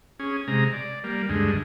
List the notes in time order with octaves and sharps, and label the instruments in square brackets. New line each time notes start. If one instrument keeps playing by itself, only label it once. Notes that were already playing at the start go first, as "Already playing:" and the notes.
[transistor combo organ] C#4 G#4
C3 G#3 A#5
D5
G3 A#3
D2 G2 G#3